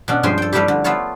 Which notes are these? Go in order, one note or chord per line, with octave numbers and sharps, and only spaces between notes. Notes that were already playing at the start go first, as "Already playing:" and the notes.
B2 C#4 D4 F#4
G2 F3 G#3 C5 G5 G#5
A4 G5
F3 G3 A3 D4 E4 G4
D3
A3 B3 F4 A4 C#5